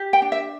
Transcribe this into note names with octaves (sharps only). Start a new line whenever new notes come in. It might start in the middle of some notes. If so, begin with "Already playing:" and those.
Already playing: G4
G5
D4
E5